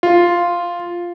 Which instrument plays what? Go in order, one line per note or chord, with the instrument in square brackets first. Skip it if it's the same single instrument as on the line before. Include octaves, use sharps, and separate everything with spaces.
[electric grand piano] F4